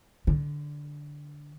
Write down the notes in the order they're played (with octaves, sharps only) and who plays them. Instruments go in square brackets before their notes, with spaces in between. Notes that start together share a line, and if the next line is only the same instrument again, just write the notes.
[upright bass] D3